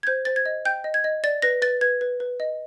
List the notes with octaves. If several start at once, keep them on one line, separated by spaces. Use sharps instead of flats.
G#6
C5 G6
C5 A6
G#6
D#5
G5 G6
D#5
G#6
D#5
D5 A6
B4 A#6
B4 A6
B4 G#6
B4
B4
D#5